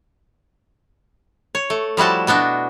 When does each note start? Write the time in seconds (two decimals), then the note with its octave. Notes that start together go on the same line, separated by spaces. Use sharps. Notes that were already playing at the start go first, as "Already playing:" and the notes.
1.55 C#5
1.70 A3
1.97 F3 G3 E4 F#4 A5
2.27 B2 B3 D4 F#4